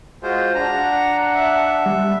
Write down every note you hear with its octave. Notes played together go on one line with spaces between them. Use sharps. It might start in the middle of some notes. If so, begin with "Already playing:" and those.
G#3 F4 F#4 C5
D4 F#5 A#5
E5
G3